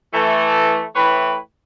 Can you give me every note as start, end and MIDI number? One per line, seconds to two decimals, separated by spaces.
0.14 0.86 52
0.14 0.86 57
0.95 1.38 45
0.95 1.38 52
0.95 1.38 71
0.95 1.38 73
0.95 1.38 79
0.95 1.38 83